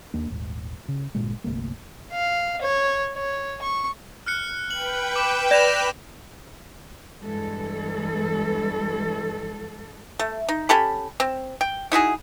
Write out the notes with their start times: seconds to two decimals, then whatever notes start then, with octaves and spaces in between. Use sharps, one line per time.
0.14 D#2 A#3 D4
0.30 D#1 G#1
0.88 C#3
1.15 G1 A#2 G#3
1.44 G1 C2 A3 A#3
2.12 F5
2.62 C#5
3.16 C#5
3.62 C#6
4.26 F6 F#6 C#7
4.71 B4 G5 F#7
5.16 D6 F#7
5.51 D5 A#6 E7 F7
7.22 E2 G2 E3 G#3 A4
10.19 A3
10.49 D#4
10.69 C#4 G4 A4 B5
11.20 C4
11.61 G5
11.92 D#4 E4 F#4 G#4